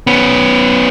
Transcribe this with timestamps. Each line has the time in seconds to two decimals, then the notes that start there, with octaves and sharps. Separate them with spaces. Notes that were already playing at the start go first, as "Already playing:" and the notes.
0.07 B3 C#4